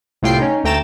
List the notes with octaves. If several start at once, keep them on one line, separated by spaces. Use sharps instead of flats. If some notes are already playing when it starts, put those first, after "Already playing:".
C2 A2 F4 G5 C7
C#4 D#4
D2 A3 G5 A#5 A6 E7